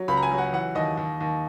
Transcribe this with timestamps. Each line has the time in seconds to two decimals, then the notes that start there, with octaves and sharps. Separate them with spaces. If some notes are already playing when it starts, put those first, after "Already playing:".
Already playing: F#3
0.08 C#2 B5
0.17 A#5
0.23 G#5
0.31 F#3
0.38 F#5
0.53 E3 F#5
0.75 D#2 D#5
0.97 D#2
1.21 D#2